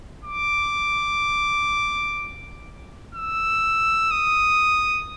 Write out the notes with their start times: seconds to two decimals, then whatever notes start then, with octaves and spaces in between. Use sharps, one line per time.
0.24 D6
3.15 E6
4.11 D#6